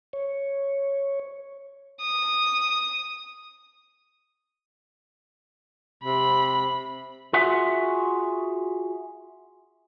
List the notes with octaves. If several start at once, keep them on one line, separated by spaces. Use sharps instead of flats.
C#5
D#6
C3 B5
F4 F#4 G#4 E5 F#5